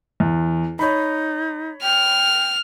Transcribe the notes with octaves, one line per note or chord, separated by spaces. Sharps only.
E2
D#4 C#5 B5
G5 F6